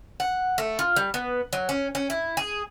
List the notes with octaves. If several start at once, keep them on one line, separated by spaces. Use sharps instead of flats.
F#5
A3
F4
G3
B3
F#3
C#4
C#4
E4
G#4